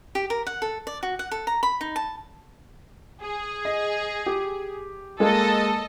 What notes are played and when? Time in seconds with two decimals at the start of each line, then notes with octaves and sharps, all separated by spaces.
0.15 G4
0.30 A#4
0.47 F#5
0.62 A4
0.87 D5
1.03 F#4
1.19 F#5
1.32 A4
1.47 A#5
1.63 B5
1.81 D#4
1.96 A5
3.21 G#4
3.65 D#5
4.26 G4
5.20 G#3 A#3 A4 D#5